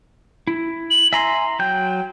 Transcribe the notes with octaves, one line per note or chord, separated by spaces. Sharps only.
E4
F#7
E5 G#5 A#5 C6
F#3 G5 G6